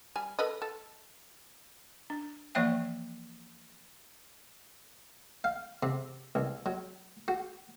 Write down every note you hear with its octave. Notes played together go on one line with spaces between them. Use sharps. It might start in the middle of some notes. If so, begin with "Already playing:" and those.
G3 G#5
A4 B4 D#5
A4
D4
E3 F3 A#3 D5 E5 G5
F5
C3
C2
F#3
F#4